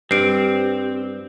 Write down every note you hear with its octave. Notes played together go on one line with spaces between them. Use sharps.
G2 C4 G4 C7 D7